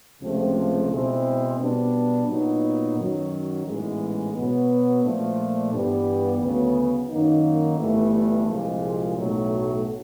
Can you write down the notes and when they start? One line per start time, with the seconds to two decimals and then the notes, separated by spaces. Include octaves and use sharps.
0.21 C#2 C3 F3 A3 C4
0.89 B2 G#3 C4 E4
1.58 B2 G3 B3 D4
2.27 A#2 F#3 B3 D#4
2.97 F#2 D#3 F#3
3.65 A1 G#2 E3 G#3 B3
4.35 B2 F#3 B3
5.03 A#2 F3 A3 D4
5.73 G2 E3 G3 B3
6.42 D2 C#3 F#3 B3
7.10 F#2 D#3 F#3 A#3 D#4
7.78 G1 G2 E3 A3
8.48 C2 A#2 F3 G#3
9.17 B1 A2 F#3 A3